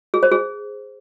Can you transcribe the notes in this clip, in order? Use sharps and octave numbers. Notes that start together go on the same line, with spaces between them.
G#4
C5
G#4